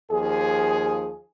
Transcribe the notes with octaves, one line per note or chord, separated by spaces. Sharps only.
D#2 F3 G#4